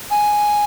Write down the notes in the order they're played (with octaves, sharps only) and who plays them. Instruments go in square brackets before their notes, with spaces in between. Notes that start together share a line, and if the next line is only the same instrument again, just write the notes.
[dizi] G#5